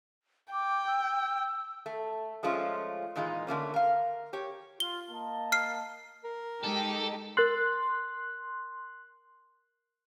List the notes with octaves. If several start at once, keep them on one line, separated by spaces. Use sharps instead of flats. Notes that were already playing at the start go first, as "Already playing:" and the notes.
G5 D6
E6
A3
F3 G#3 A3 C#4 F4
A#2 E3 G#3 D#4 F4
D3 A3 A#3 C#4
A#4 F5
G4 C#5
F4 G7
A#3 D#5 A5
F6 C7
A#4
G#3 D#4 G4 A4
A#4 C6 F#6 A6 F#7